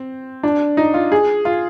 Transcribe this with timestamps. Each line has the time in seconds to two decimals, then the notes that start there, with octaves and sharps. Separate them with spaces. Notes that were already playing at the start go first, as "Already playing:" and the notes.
Already playing: C4
0.43 D4
0.77 D#4
0.94 F4
1.12 G#4
1.45 F4